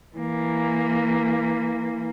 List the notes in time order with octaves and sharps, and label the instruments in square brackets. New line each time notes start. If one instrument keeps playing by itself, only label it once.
[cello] E3 A#3